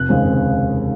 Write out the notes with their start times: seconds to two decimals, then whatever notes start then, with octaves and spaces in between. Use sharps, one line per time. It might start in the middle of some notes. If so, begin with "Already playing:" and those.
Already playing: F1 F#6
0.09 D#2 C#3 G#3 C4
0.24 F1